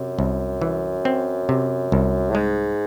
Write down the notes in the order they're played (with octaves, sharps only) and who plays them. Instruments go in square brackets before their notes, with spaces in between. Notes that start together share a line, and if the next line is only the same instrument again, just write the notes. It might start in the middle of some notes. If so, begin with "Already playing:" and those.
Already playing: [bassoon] F#2 [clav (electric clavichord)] C3
[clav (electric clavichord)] C2
E3
C4
C3
C2
[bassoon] A2
[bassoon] G#2 [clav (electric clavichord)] G#3